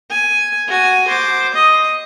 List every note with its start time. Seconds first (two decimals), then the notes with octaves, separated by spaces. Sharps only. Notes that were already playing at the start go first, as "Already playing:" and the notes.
0.10 G#5
0.68 F#4 G#5
1.08 C5 D6
1.54 D#5